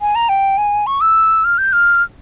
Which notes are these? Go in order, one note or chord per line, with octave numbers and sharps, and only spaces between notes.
G#5
A#5
G5
G#5
C#6
E6
F6
G6
F6